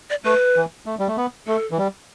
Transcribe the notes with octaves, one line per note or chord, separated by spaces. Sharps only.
D5
A3 B4
E3
A3
G3
A3
B3
A3 A4
E3
G3